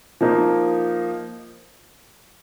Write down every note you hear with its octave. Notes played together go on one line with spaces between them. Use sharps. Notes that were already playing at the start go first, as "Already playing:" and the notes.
F3 A#3 D#4